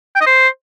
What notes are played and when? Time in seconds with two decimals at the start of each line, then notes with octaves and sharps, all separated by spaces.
0.15 G5
0.21 D#5
0.27 C5